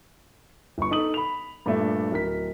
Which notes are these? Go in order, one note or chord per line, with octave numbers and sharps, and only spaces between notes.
G1 C#6
D#4 A4 D#6 F#7
B5 F7
G2 A#2 A3 D4
D1 A#4 B6